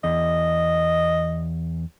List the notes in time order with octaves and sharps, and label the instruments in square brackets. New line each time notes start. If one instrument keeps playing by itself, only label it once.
[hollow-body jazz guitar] E2 [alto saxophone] D#5